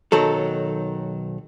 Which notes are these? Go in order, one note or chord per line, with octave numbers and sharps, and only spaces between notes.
B1 D#3 F#3 A4